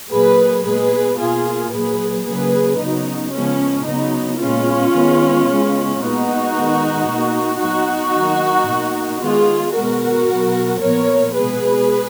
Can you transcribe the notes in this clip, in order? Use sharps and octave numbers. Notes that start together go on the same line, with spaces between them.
A#2 F#3 A#3 G#4 B4
A#2 G#3 B3 G#4 B4
B2 A#3 F4 G#4
A#2 F#3 A#3 G#4 B4
C#3 F#3 A#3 G#4 B4
C#3 F#3 B3 D#4
C#3 F3 G#3 B3 C#4
C#3 F#3 B3 D#4
A#2 G#3 B3 C#4 F4
D#3 G#3 B3
C#3 G#3 B3
A#2 G#3 B3 D#4 F#4
D#3 G#3 B3
B2 A#3
A#2 F#3 B3 D#4 F#4
D#3 F#3 A#3
B2 A#3
D#3 G#3 B3 F4 G#4
B2 G#3 B3 F#4 A#4
B2 F#3 B3
A#2 F3 B3 A#4 C#5
B2 G#3 B3 G#4 B4